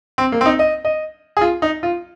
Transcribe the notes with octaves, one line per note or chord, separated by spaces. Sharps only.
C4
A#3
C4
D#4
D#5
D#5
G#4
F4
D#4
F4